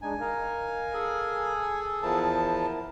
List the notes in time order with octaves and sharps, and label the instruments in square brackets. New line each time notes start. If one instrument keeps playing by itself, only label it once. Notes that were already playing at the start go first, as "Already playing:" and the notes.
[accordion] G#3 D4 D#4 [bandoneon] G#5
[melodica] D#4 [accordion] A#4 F5
[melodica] G#4 A4
[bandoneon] E2 F3 A5 [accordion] E4 A#4